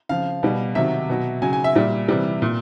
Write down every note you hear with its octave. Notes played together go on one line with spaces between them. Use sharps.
C#3 F3 F5
B2 G3
C3 D#3 F#3 E5
B2 F#3
C#3 F#3 G#5
G#5
E5
A#2 G3
C3 E3 G3
A#2